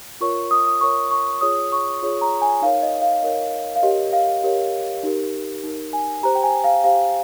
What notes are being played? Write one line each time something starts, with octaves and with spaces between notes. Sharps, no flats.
F4 A#4 C#5 C#6
D#6
D#6
F4 A#4 C#5 C#6
C#6
F4 G#4 C#5 D#6
C#6
F4 G#4 C#5
A#5
G#5
D#4 A#4 C#5 F5
D#5
F5
D#4 A#4 C#5 D#5
F5
G4 A#4 C#5 D#5
F5
G4 A#4 C#5
D#4 G4 A#4
D#4 G4 A#4
G#5
G4 C5 A#5
G5
G#5
F5
G4 C5 F5